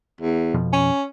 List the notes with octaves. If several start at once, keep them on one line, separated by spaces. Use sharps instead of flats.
E2
F2 B2 F3
C#4